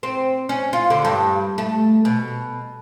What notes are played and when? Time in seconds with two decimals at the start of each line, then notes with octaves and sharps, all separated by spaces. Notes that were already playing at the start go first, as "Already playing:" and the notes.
0.03 C4
0.49 C#4
0.73 F4
0.90 D3
1.05 G2
1.58 A3
2.05 B2